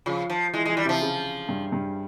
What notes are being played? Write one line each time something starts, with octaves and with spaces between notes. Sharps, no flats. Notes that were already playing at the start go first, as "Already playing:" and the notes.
C#3 F3
F3
E3 G#3
G#3
E3
G3
C3
F3
C#3
G2
G2